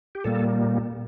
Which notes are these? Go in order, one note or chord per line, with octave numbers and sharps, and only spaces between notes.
G4
A#2 G3 A#3 A4